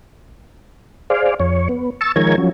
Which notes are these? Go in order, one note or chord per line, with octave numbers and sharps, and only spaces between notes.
G#4 C5 D5 F5
F2 C#5
B3
A5 C#6 E6
D#3 F3 G#3 A#4 C#5 G#6
F3 F#3 C#4